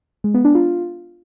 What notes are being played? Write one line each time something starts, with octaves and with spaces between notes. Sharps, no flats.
G#3
B3
D4
F4